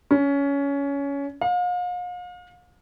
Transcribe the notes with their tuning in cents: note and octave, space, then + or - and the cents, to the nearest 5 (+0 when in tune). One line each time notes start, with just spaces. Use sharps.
C#4 +20
F5 +40